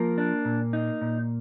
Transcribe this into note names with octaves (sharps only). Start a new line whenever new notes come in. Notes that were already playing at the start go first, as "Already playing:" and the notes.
Already playing: F3 A#3 A#4
D4
A#2
D#4
A#2